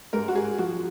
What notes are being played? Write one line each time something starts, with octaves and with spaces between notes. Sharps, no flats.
G#2 A#4
F#4
G#4
F3 F#4